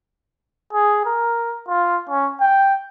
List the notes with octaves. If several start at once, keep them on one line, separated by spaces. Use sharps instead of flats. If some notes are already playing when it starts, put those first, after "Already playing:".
G#4
A#4
F4
C#4
G5